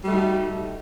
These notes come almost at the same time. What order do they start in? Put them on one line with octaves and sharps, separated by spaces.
G3 A3 F#4 D#4